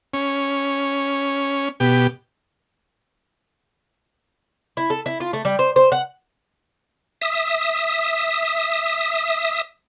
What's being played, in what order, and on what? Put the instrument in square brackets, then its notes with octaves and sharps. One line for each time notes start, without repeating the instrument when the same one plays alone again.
[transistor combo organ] C#4
B2 G4
[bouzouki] E4
A4
E4
F4
A3
G3
C5
C5
F#5
[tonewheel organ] E5 D#6